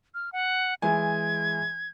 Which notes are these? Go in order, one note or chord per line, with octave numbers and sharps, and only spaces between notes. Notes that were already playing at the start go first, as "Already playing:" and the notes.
F6
F#5
E3 G#3 G#5 G#6